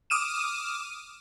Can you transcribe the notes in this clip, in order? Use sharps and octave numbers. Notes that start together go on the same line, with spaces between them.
D6 D#6 F6 D#7 E7